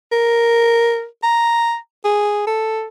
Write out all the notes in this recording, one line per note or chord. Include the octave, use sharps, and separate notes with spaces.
A#4
A#5
G#4
A4